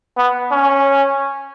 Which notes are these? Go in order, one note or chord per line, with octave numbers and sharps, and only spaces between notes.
B3
C#4